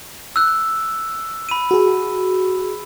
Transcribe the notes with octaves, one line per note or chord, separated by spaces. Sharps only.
E6 F#6
B5 D#7
F#4 G#4